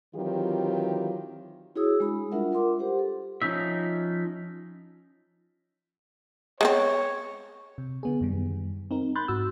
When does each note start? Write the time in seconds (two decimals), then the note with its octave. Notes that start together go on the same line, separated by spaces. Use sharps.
0.16 D#3 E3 F#3 C4 F4 G4
1.76 E4 F#4 G#4 C#5 D#6 E6
2.00 G#3 D4 B5
2.32 G3 D4 F4 A#4 E5 F#5
2.52 F4 A#4 F#5 C6 D6
2.79 G4 C5 F#5
2.99 A4
3.42 F3 C#4 D#4 E5
6.61 G#3 B3 C4 C#5
7.78 C3
8.03 D3 B3 G#4
8.21 F#2 D#3 G3
8.91 C4 D#4 A#4
9.15 B5 C6 F#6 G6 A6
9.28 G#2 F#4 E6